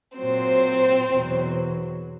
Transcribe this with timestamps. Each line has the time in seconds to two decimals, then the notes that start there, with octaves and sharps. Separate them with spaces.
0.17 A#2 F#3 C4 C5
1.10 E2 B2 F#3